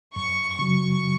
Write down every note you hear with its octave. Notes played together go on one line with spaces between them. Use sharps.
F#2 C#6
C#3 F#3 C#6